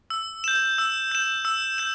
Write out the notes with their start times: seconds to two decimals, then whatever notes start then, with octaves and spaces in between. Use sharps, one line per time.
0.10 E6
0.44 G6 E7
0.78 E6
1.12 G6 E7
1.45 E6
1.78 G6 E7